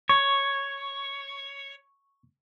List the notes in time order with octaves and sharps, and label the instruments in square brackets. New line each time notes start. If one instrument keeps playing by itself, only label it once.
[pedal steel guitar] C#5 [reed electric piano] C#6